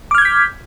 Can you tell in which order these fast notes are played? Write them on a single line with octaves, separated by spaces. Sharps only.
D6 F6 G#6 G6 B6